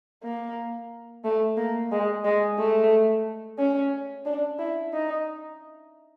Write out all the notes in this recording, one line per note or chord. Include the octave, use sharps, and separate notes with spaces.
A#3
A3
A#3
G#3
G#3
A3
C#4
D4
E4
D#4